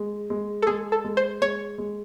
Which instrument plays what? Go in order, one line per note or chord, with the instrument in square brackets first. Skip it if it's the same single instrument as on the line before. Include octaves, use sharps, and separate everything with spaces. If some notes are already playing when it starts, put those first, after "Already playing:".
Already playing: [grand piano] G#3
G#3
[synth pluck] A4
[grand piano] G#3 [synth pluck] G#4
[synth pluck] A4
[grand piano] G#3
[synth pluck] C5
[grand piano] G#3 [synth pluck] C#5
[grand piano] G#3